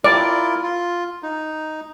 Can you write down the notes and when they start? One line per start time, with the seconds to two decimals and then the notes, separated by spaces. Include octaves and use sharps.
0.04 E4 F4 A#4 D5
0.63 F4
1.23 D#4